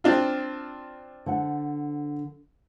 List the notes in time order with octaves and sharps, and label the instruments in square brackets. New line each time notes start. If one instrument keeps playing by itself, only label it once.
[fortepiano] C4 D4 F4
[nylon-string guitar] D3 C5 F#5